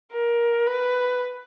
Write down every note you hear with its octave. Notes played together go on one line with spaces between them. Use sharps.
A#4
B4